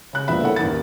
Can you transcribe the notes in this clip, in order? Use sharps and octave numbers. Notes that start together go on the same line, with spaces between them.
C#3 F#6
E1 A#2 F3 B3 E5 B5
E4 A4 A#4 C#5 F#5
A1 D#2 A#4 A6